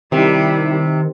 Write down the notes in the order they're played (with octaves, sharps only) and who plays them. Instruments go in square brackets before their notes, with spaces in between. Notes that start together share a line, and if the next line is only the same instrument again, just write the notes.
[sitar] C3 [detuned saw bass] D#3 [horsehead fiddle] G3 E4